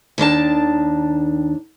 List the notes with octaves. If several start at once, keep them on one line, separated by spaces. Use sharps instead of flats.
D#2 D#3 D4 A5